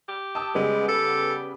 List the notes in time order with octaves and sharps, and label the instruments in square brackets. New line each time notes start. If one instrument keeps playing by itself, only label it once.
[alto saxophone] G4
[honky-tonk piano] A5 D#6 E6
[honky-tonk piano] C#3 G3 B3 [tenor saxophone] G#3
[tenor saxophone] A4